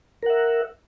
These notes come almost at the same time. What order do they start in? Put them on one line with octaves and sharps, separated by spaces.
A#4 F#5 E5